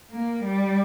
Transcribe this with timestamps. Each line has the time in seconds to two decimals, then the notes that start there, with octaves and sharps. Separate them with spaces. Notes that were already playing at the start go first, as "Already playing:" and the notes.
0.12 A#3
0.44 G3